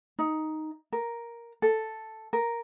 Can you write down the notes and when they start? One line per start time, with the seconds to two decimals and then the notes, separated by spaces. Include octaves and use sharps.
0.19 D#4
0.93 A#4
1.62 A4
2.33 A#4